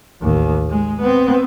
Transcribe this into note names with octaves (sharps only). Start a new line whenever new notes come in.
A1 D#2
G#3
B3 C4